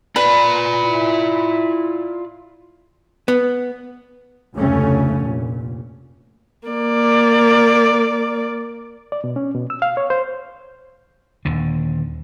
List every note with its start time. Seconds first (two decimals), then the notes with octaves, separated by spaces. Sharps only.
0.16 F4 B4 D5
0.84 E4
3.28 B3
4.55 F1 D2 C#3 A3 C#4
5.18 F1 A#2
6.68 A#3 D5
9.12 D5
9.24 B2
9.36 C#4
9.54 B2
9.70 E6
9.82 F5
9.97 C#5
10.10 C5
11.45 D#1 D#2 D3